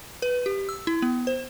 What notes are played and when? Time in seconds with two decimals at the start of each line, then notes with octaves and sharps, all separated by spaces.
0.22 B4
0.46 G4
0.69 E6
0.87 E4
1.02 B3
1.27 C5